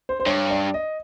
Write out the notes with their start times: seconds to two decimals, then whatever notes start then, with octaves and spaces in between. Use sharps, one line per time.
0.09 C5
0.20 C5
0.26 G2 C#5
0.50 D5
0.74 D#5